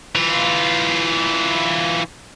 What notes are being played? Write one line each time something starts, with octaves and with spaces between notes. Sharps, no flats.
E3 F4